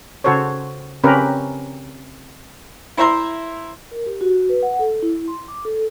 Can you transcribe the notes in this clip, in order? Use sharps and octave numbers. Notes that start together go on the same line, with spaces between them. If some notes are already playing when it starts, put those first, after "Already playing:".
C#3 F#4 A4 C5 C#5
C#3 C4 C#4 G4 A#4 B4
E4 C5 E5 A#5 C6
A#4
G4
F#4
B4
F#5
A4
E4
C6
D6
A4